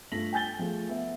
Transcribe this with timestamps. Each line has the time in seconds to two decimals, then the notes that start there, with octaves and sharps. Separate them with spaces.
0.12 G2 A3 F4 A#6 B6 F#7
0.33 G5 G#5 G6 A6 G7
0.59 F3 A3 G#4
0.89 B3 E5